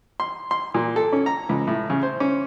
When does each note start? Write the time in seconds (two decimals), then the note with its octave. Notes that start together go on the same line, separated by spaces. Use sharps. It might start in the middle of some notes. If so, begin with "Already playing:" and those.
0.20 C6
0.51 C6
0.74 A#2
0.96 A4
1.12 C#4
1.26 A#5
1.49 C#2
1.67 A2
1.90 C#3
2.03 C5
2.20 C#4